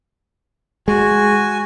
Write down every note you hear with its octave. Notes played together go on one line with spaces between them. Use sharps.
G#3 F#4 G#5